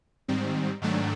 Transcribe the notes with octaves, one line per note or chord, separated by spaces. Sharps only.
G#2 D#3 G3 C4
G#2 D#3 F#3 A3 D4